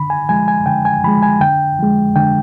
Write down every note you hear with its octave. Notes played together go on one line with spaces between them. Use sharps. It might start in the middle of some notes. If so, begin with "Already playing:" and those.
Already playing: D3 B5
G#5
F3 G#3 G#5
G#5
D3 G5
G#5
F3 G#3 B5
G#5
D3 G5
F3 G#3
D3 G5